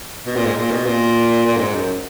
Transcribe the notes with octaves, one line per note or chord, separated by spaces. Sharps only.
B2
A#2
G#2
A#2
B2
A#2
A#2
F#2
G#2
F#2